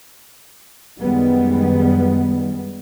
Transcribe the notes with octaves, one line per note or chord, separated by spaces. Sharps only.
F#2 D#3 G3 G#3 B3